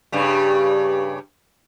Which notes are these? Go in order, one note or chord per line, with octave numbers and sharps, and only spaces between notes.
G2 C#3 G3